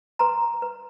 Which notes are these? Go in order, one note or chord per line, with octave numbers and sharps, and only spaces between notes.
B4 A#5 C6
B4